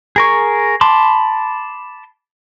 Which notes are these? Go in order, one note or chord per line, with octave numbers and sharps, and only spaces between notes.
G#4 A#4 C#6
A5 B5 C6 D6